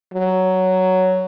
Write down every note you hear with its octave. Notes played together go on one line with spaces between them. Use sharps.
F#3